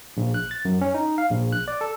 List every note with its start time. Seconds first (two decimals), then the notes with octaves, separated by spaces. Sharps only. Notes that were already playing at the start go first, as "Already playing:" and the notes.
0.17 A#1
0.34 F#6
0.51 A6
0.65 F#2
0.81 C#4
0.94 D#4
1.18 F5
1.30 A#1
1.53 F#6
1.68 D5
1.81 A4